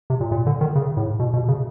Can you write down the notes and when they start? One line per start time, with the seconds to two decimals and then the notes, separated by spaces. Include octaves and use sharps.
0.10 C3
0.21 A#2
0.32 A#2
0.47 D3
0.61 D#3
0.75 C#3
0.97 A2
1.19 B2
1.33 B2
1.48 C#3